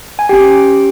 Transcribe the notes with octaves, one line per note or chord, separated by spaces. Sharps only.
G#5
C#4 G4 G5